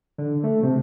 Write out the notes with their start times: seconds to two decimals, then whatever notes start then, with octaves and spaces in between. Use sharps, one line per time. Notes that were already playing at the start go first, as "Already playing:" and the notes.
0.18 D3
0.44 A3
0.63 C3